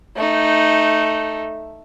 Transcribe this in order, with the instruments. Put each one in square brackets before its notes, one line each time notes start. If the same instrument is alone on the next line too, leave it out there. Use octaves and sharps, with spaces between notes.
[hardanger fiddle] A3 D#4